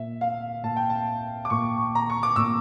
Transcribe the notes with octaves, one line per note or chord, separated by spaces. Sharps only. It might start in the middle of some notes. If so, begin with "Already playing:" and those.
Already playing: A#2 E5
F5
A#2 A5
G5
A5
D6
A#2 C#6
A#5
C#6
D6
A#2 E6